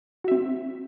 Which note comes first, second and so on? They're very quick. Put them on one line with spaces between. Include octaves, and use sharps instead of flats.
F#4 E5 C4